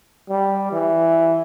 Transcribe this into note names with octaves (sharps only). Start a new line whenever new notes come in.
G3
E3